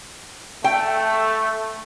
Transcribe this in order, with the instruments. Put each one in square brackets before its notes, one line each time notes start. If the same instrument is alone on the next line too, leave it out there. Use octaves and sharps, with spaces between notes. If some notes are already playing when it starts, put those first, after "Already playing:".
[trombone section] A3 [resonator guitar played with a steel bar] G5